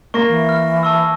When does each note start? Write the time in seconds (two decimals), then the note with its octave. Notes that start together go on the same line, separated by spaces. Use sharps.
0.14 A#3 C#6 A#6
0.28 E3
0.49 F6
0.83 A5 C#6 E6